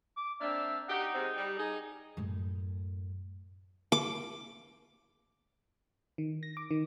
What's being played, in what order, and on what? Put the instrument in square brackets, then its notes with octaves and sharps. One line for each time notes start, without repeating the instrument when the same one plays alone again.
[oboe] D6
[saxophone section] A#3 C4 D4 [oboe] E5
[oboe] D#4 [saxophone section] G4 F#5
[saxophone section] C3 G#3 C4
G3
D#4 G#4
[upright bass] F#2 A2
[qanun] D6
[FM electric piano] D#3
A#6
D6
D#3